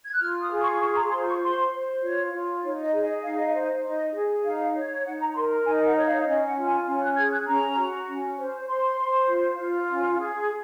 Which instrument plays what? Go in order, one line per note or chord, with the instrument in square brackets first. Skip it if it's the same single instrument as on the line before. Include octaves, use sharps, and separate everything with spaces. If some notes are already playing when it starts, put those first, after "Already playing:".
[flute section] G#6
F#6
F4 F6
D#6
G#4
C#6
F4 C#6
A#5
C5 C6
C#6
C5 C6
C5
F4 C#5
F4
D#4 C#5
D#5
G#4
D#5
D#4 F5
D#5
F5
C5
D#4 D#5
G#4
D#4 F5
C#5
D#4 F#5
A#5
A#4 C6
A#5
D#4 G#5
F#5
C#5 D#5
F5
C#5
C#4 D#5
F#5
F4
G#5
C#4 G#5
F#6
G#4 G#6
F#6
C#4 A#5
F#4
C#4
C5
C5 C6
C5
F4
F4
C#4
G#4